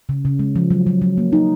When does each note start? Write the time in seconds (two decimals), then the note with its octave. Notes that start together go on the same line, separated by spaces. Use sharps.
0.09 C#3
0.25 C#3
0.39 G#3
0.56 F3
0.71 F#3
0.87 F#3
1.02 F#3
1.17 A#3
1.33 D#4